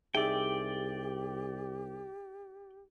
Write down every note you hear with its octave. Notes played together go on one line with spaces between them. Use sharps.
C2 D#4 G4 G#4 D5 E5 G5